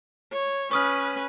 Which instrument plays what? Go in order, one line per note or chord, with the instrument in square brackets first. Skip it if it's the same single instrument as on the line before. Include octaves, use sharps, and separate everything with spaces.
[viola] C#5
[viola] C#4 B4 [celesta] C#6 D#6 F6